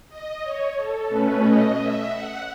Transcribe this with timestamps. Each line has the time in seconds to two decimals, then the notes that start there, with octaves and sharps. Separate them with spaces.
0.09 D#5
0.42 C#5
0.76 A4
1.08 B2 A3 C#4 B4
1.42 D#5
1.75 E5
2.07 F#5